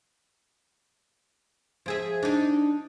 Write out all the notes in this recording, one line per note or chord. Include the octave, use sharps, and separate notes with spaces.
F3 G#4 E5
D4 D#4